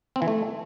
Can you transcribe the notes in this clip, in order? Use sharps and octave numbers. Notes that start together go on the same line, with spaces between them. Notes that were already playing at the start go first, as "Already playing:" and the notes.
C4
E3
A3